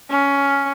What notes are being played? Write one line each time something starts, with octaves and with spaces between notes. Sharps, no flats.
C#4